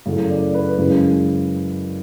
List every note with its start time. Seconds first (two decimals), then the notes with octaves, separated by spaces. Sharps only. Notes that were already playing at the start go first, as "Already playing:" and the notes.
0.06 F#2 C#3 E3 A3
0.30 D5
0.54 B4
0.78 F#2 C#3 E3 G#3